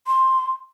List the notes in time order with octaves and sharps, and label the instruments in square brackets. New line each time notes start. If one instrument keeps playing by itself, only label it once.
[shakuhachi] C6